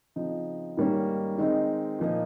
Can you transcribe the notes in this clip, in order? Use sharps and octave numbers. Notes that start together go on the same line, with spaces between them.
C#3 F3 C4 D#4
G#2 D#3 G3 A#3 C#4
D#3 G#3 C4 D#4
A#2 F3 A#3 D#4